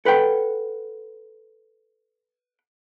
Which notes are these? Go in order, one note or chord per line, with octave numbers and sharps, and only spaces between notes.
A4 B4 F#5 G5